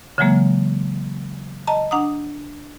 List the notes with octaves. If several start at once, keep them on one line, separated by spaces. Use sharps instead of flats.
C#3 E3 F#3 G#3 A#3
D#5 A5 A#5
D4 F#5 A#5 D#6